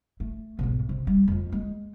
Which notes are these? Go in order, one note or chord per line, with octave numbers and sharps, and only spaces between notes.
A3
B1 G#2
C3
G3
F2 F4
G#3